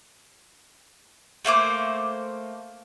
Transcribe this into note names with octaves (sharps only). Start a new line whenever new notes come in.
A3 A#3 C5 D6